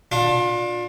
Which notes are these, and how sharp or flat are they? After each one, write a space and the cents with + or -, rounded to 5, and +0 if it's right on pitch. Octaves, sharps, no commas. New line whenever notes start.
D4 +10 F4 +30